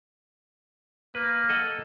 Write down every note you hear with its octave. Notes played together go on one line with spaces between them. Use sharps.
A#3 B4
A4 D#5 F#5